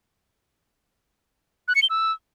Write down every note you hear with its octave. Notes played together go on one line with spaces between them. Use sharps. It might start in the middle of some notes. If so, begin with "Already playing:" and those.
F#6
C#7
G7
E6